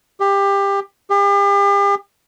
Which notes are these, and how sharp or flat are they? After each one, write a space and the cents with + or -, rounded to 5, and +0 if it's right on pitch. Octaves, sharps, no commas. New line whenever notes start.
G4 +20
G4 +40